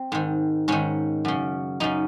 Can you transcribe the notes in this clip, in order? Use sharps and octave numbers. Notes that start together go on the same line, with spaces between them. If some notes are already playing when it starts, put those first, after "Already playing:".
Already playing: C4
G#2 D#3
G#2 D#3 C#4
F#2 C#3
F#2 C#3 D#4